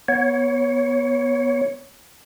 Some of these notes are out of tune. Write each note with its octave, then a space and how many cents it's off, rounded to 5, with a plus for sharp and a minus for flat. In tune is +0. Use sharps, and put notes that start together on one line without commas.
B3 -15 C#5 +0